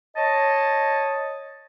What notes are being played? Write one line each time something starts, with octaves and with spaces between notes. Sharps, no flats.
C#5 D#5 A5